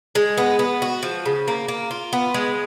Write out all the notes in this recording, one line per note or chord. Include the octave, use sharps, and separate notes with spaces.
G#3
B3
B3
F#4
F3
C#3
A#3
A#3
F4
B3
G#3